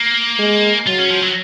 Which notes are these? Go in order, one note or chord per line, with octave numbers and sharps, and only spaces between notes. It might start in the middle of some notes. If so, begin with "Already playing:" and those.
Already playing: A#3
G#3
F#3 F4
C#4
F3
F#3